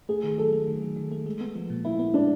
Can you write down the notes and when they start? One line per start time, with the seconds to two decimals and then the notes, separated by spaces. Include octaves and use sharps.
0.09 A3 G#4
0.23 D#3
0.38 F#3 A4
0.53 A3
0.68 D#3
0.82 F#3
0.96 D#3
1.12 A3
1.26 G#3
1.41 B3
1.55 F3
1.70 A#2
1.85 B3 E4
1.99 B3
2.14 G#3 D4